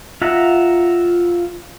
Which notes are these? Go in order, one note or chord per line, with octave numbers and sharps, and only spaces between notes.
F4 E5 F#5 A#5